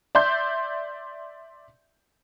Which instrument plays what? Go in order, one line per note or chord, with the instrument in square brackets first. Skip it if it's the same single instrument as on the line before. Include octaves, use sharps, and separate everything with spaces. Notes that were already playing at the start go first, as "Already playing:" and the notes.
[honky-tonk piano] D5 E5 C6 G6